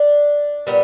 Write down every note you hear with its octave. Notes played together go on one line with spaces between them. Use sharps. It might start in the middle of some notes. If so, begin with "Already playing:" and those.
Already playing: D4
A#2 G3 B3